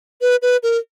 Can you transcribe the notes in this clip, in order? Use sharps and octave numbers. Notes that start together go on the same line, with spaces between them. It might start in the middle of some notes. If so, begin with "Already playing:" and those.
B4
B4
A#4